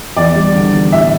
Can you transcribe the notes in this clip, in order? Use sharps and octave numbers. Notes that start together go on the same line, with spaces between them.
E2 D5
G3
D3
E2
A2 E5